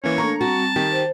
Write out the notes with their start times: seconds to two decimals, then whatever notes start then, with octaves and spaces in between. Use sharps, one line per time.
0.04 E3 A#3 C#4 C#5
0.18 A3 A#3 D4 A4 A#5 C#6
0.41 G3 C4 F#4 G5 A5
0.76 D#3 G4
0.92 C5